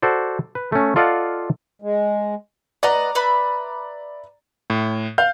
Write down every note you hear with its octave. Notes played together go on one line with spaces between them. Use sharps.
F#4 A4 C5 D5
B4
A3 C#4
F4 A4 D5 D#5 F5 F#5
G#3
B4 D5 D#5 F#5 A#5
B4 E5 B5
A2
F5 G6